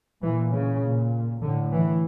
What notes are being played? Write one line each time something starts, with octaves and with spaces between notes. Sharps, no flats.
A#2 E3
C#3
A#2
A2 D3
E3